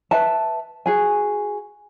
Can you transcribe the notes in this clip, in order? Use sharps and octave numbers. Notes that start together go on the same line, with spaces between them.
B4 E5 A5
F#4 G#4 G#5